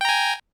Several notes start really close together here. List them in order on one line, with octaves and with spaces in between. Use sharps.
G5 A#5 G#5